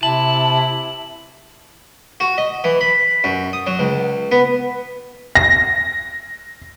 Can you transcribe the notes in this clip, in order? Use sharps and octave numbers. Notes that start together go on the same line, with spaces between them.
C3 E4 A5 F#7
F#4
D#5
E3
B5
F#2
D#6
F#3
C#2
B3
A#6